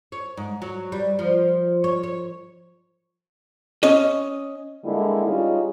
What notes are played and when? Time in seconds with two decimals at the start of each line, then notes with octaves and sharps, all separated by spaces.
0.12 C#5
0.37 G#2
0.62 F#3
0.92 G3
1.19 F3
1.84 C#5
2.03 C#5
3.83 C#4 D#5
4.84 D3 G3 G#3 A#3 E4
5.26 G3 C#4 D#4 F4 G#4